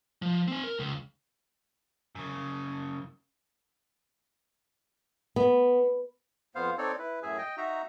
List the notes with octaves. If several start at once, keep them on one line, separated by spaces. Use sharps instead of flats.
F3
C4 G#5
A#4
C#2
F#2 C#3
B3
F2 B3 C5 F5
C4 D#4 A4 C#5 D5
E4 B4
F#2 A2 G#4 E5 G#5
D#5 G5
D#4 F#4 E5 A#5